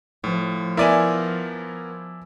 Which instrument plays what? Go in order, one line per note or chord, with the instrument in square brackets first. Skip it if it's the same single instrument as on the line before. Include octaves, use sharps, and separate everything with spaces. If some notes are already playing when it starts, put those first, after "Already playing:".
[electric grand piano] A2 [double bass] F3
[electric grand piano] B3 A#4 [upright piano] E4 D5 G#5